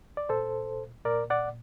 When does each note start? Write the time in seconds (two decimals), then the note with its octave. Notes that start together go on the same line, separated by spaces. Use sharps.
0.17 D5
0.29 A#2 A4 C5
1.05 A#2 A#4 D5
1.30 D5 F#5